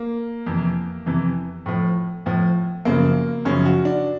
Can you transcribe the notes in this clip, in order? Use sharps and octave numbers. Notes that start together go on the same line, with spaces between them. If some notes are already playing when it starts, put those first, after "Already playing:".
Already playing: A#3
F2 C3 E3
F2 C3 E3
A2 F3
A2 F3
F#2 C#3 F3 A#3
F#2 C#3 F3 C#4
F#4
D4